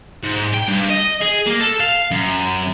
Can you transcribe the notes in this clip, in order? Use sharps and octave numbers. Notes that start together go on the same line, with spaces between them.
G#2
G5
G2
D#5
G#4
A#3
A4
F5
F#2